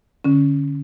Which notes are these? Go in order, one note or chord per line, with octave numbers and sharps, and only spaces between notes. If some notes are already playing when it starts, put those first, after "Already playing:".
D3 C#4